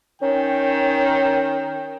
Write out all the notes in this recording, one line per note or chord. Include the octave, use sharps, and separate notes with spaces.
D#3 C#4 G5